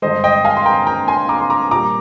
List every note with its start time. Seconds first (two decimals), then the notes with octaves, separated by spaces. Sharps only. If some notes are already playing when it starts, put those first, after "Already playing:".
0.02 G2 D3 G#3 C5 D#5
0.24 D#5 G5
0.45 F5 G#5
0.57 C6
0.66 G5 A#5
0.87 G5 A#5
1.08 G#5 C6
1.29 A#5 D6
1.40 C6
1.50 A#5 D6
1.71 A#2 G3 A#5 D6